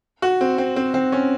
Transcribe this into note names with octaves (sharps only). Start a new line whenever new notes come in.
F#4
C4
C4
C4
C4
C#4